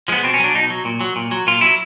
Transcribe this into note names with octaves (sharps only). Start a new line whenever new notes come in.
F3 G#3 B3
B2 C4
C#4
F#3 D4
B2 D#4
F#3
A#2
F#3
A#2
F#3
A#2 F4
F#3 E4